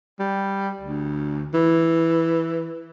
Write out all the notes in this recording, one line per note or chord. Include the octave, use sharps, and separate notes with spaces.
G3
D2
E3